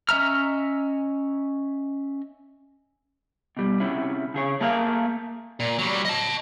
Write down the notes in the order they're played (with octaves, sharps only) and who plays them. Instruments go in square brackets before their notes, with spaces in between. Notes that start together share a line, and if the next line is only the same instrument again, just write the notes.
[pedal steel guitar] C#4 D#5 E5 A#5 F6
[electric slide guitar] B2 G3
C3 C#4 E4
C#3 G#4 C#5
A3 A#3 G#4 A#4 F5
[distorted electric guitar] A#2
F#3 G3
D#5 A5